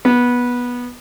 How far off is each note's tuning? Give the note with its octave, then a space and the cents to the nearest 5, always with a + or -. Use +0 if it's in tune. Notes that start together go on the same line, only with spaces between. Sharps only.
B3 -15